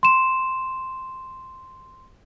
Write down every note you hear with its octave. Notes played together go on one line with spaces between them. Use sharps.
C6 E7